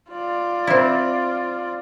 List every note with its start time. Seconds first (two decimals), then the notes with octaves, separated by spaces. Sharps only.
0.11 F4 D5
0.67 C4 E4